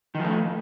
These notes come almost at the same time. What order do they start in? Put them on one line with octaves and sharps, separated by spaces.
D#3 F3 A3